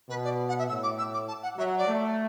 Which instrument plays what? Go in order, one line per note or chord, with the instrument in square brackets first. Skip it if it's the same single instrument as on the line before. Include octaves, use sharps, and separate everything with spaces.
[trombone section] B2 [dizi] B4
[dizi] D5
F#5
E5
[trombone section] A2 [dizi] E6
[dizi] D6
E6
D6
A5
F#5
[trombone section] F#3 [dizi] E5
[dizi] D5
[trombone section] A3